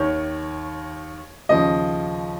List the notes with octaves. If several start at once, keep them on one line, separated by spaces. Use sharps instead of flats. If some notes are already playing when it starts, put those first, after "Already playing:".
Already playing: D#2 D#3 C#5
D#2 C#3 F3 D#5